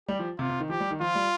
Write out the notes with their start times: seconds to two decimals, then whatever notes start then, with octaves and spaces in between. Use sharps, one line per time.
0.08 G3 G4
0.19 F3
0.39 C3 F4
0.49 C3
0.60 D#3
0.69 F3 G4
0.80 G3
0.91 D#3
1.00 F3 F4
1.15 G3